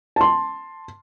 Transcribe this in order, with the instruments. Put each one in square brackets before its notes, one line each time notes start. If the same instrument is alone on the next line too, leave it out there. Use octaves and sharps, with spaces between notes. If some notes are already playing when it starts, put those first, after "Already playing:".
[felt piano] A5 C6